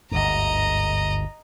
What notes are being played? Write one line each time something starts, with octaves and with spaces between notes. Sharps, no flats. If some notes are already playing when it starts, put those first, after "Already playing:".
G1 D2 G#2 D#5 A#5